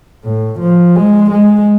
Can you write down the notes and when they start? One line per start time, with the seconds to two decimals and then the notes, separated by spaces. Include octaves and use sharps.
0.24 A2
0.60 F3
0.96 G#3
1.31 G#3